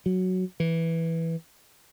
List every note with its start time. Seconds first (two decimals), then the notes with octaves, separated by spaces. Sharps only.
0.06 F#3
0.60 E3